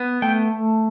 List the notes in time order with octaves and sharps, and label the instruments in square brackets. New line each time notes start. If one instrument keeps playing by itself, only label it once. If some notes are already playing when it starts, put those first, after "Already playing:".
Already playing: [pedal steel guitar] B3
A3 G5